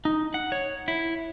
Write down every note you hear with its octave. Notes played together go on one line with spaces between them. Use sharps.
D#4
F#5
C#5
E4